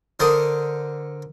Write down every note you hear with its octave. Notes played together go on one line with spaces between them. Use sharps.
D3 A#4 C5 A5 D#6